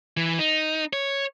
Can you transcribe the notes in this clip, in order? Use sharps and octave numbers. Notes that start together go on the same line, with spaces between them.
E3
D#4
C#5